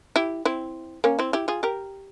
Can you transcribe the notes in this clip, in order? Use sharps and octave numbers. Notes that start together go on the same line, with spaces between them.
E4 G4
C4 E4
A#3 C#4
C4 E4
E4 G4
F4 G#4
G4 A#4